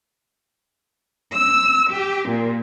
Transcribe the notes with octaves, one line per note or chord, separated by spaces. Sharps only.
E6
G4
A#2